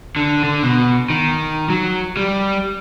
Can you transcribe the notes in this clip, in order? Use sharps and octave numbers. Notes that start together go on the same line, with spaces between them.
D3
D3
B2
D#3
F#3
G3